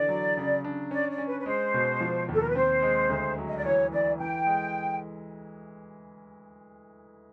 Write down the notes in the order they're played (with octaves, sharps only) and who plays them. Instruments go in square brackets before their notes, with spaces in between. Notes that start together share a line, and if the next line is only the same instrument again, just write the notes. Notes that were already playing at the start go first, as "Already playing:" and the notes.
Already playing: [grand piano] D3 E3 [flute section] D5
[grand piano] F#3
C#3
D4
[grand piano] C#4 [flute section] D5
[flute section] D5
[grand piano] C#4
[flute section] B4
B4
[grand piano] G#3 [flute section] C5
[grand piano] B2
F3
D#2
[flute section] A4
A#4
B4
[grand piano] C4 [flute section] C5
[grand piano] G#3
D2
F#3
[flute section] D#5
D5
[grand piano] E3 [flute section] C#5
[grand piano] E3 [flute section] D5
[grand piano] E3 [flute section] G5
[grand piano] G#3